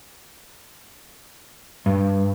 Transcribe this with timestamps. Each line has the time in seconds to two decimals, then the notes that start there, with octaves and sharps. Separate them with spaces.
1.86 G2